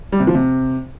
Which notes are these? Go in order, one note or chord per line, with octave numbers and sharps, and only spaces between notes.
G3
C3
F3
C3